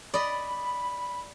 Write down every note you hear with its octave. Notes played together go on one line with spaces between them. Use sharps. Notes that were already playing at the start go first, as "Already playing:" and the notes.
D5 D#5 B5